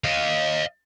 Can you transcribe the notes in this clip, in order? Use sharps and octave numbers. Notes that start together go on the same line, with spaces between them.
D#5 F5